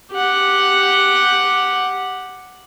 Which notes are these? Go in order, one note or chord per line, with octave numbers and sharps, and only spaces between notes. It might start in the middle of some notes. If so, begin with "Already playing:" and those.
G4 F#5